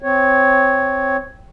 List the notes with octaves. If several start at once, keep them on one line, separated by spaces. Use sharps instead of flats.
C4 C#5